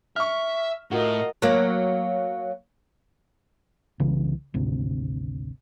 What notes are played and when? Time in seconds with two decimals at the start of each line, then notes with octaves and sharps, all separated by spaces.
0.16 E5 C#6 F6
0.91 A2 F4 F#4 A#4 D#5
1.42 F#3 A#3
4.00 C2 C#3 E3
4.54 G#1 D2 C3